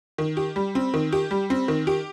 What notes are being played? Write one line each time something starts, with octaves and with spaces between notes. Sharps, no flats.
D#3
G4
G3
C4
D#3
G4
G3
C4
D#3
G4